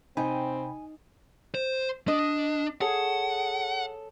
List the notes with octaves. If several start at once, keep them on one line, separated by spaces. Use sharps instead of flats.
C3 C4 D#4 G5 G#5 B5
C5
D4 D#5
G#4 A4 C#5 F#5